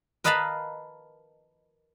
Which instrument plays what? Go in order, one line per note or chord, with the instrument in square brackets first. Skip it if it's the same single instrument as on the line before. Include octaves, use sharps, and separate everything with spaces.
[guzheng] A#4 B4 D#5 F5 A5 B5